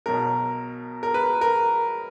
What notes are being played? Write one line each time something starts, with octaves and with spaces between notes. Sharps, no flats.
B1 B2 F#3 A#4
A#4
B4
A#4